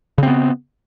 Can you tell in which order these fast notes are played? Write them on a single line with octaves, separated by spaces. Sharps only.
C#3 C4 B3